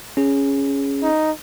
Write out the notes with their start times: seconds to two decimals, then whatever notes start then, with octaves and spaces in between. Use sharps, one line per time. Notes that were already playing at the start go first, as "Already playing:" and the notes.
0.17 C#4 G#4
1.02 D#4